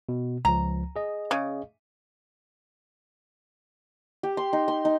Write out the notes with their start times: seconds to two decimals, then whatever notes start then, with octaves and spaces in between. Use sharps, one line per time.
0.09 B2
0.45 C#2 F3 A#5
0.96 G#4 D#5
1.31 C#3
4.23 G4
4.37 C6
4.53 D#4
4.68 C6
4.85 D#4